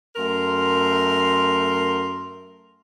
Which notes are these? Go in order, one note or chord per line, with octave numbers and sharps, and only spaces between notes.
F#2 A3 A#4 C6